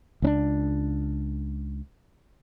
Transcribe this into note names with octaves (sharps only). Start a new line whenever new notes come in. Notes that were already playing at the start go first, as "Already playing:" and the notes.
C#2 C#4 D4